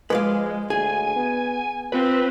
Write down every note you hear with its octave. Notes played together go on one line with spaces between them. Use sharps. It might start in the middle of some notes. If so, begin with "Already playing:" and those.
F3 G#3 B4 D5 F5
D2 G#4 G#5
B3
C4 F4 B4